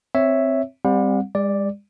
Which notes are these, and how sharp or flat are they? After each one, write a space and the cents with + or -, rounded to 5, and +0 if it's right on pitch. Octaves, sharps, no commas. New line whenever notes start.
C4 +0 C#5 +0 E5 +0
G3 +15 C4 +0 F#5 -40
G#3 -45 D5 +0